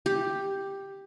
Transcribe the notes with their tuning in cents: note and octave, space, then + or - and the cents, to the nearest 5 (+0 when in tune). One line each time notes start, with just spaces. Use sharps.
G4 +5